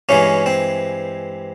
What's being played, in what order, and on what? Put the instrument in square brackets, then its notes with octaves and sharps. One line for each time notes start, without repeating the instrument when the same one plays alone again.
[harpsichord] G2 E3 G#3 C#4
C4